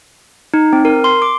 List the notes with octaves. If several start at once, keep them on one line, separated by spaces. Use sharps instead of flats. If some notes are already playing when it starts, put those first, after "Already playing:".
D#4
C4
A#4
C6
D6